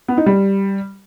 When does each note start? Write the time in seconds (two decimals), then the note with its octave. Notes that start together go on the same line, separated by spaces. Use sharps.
0.08 B3
0.17 D#4
0.26 G3